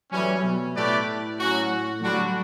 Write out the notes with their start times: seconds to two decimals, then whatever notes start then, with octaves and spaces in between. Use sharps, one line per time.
0.12 A2 E3 F#3 G3 C#4
0.44 B2
0.75 A2 A3 E4 G4 B4 D5
1.39 F#3 C#4 F#4
2.02 D3 F#3 G3 D4 F#4